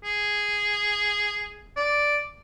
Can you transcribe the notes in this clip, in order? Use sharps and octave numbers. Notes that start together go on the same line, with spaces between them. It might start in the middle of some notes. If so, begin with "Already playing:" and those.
G#4
D5